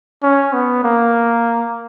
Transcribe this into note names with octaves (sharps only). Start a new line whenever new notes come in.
C#4
B3
A#3